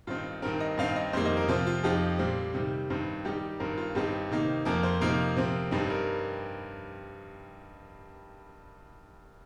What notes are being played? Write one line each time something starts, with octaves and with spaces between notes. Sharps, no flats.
G2 D#3 C4 D#4 F4
G2 D#3 C4 A#4
D#5
G2 D#3 C4 D#4 F5
D#5
F2 D#3 G3 A#3 C5
D#5
A#4
C3 F3 C4 F4
F4
F2 F3 D#4 G4
A#2 G3 C4
C3 D#3 G3
G2 D#3 C4
D#3 G3 D#4 G4
G2 D#3 C4 A#4
F4
G2 D#3 C4 D#4 G4
C3 D#3 A#3 D#4
F2 F3 A#3 A#4
C5
C3 F3 A#3 D#4 A#4
C3 F3 C4
G2 G3 C4 D#4
A#4